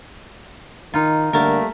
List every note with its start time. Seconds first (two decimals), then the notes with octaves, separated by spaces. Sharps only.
0.94 D#3 D#4 F4
1.33 D3 G3 A3 A#3 A#4 E5 A5